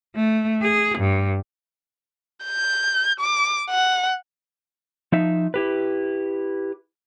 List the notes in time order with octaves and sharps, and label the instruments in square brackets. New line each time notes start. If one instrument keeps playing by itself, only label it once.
[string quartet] A3
G#4
G2
[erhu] G6
D6
F#5
[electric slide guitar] F3 D#4 E5
E4 G4 B4